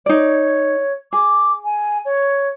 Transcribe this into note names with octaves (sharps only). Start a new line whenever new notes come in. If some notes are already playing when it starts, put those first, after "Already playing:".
D#4 C#5 D5
G#4 D6
G#5
C#5